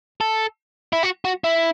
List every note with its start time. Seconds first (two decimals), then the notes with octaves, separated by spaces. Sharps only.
0.21 A4
0.93 E4
1.03 F#4
1.25 F#4
1.44 E4